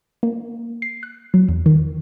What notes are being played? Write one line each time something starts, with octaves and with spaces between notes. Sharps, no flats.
A#3
C7
F#6
F#3
E2
D#3